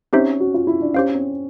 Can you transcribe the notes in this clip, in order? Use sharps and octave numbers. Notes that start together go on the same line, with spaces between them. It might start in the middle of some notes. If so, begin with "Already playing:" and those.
C4 C#4 D#4 G4 C5 E5
F#4
F4
E4
D4
C#4 G4 C5 F5
C4